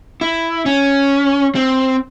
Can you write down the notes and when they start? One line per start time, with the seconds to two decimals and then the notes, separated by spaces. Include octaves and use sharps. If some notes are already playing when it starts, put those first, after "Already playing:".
0.21 E4
0.66 C#4
1.55 C4